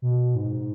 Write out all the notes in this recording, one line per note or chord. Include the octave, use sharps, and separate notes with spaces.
B2
G#2